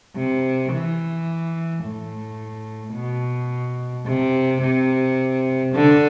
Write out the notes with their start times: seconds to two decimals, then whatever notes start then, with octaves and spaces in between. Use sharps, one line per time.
0.16 C3
0.73 E3
1.84 A2
2.94 B2
4.06 C3
4.62 C3
5.73 D3